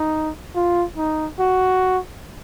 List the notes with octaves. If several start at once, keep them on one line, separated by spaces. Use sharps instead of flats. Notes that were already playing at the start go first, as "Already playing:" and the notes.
Already playing: D#4
F4
D#4
F#4